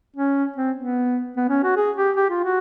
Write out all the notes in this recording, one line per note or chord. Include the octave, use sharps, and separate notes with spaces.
C#4
C4
B3
B3
C#4
F#4
G#4
G4
G4
F4
F#4